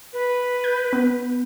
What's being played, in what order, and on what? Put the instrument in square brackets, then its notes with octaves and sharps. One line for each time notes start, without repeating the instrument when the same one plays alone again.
[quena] B4
[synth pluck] G6
B3